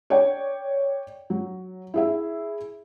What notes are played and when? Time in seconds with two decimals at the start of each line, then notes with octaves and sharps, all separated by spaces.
0.10 C#5 D5 G5
1.30 F#3
1.94 E4 G#4 E5